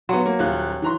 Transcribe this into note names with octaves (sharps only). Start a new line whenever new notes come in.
F#3 B3 C6
A#3
D#1 F4 F#6
E3 A#5 C6